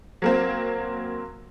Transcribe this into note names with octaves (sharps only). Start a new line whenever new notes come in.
F#3 A#3 C4